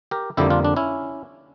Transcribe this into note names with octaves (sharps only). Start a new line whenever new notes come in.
G4 A#4
F2 D3 G3 A#3 E4 G4
D4 F4
D4
C#4 E4